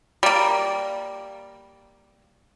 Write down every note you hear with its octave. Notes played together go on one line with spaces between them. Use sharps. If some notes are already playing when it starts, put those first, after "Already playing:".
G3 A#3